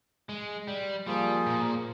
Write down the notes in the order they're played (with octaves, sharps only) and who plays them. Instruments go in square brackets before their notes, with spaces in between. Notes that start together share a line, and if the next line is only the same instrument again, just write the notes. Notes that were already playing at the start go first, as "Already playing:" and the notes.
[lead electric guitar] G#3
G3
[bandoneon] F3 A#3 F4 G#4 [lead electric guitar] G3
[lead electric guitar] A#2